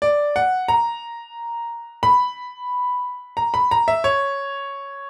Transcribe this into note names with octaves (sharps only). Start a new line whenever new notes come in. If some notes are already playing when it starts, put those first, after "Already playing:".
D5
F#5
A#5
B5
A#5
B5
A#5
E5
C#5